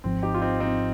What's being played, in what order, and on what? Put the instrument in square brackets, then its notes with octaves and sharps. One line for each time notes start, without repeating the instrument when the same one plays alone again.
[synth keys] G#1 G#2 F3 [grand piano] C4
[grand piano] D#4 G4
F4
C4 D#4
C4 D#4